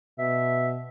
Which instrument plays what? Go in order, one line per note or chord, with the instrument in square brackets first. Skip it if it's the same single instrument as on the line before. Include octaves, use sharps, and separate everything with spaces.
[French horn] B2 [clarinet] E5